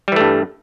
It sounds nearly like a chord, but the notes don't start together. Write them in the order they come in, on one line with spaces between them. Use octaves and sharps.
G3 E3 A3 G2